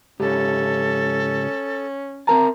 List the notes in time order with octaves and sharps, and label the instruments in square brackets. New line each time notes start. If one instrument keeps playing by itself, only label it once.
[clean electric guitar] C#2 G#2 G4 [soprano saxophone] C#4 [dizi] A4
[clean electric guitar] C4 A#4 A5 [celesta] A#5